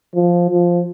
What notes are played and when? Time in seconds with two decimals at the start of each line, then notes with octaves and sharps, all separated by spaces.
0.15 F3
0.50 F3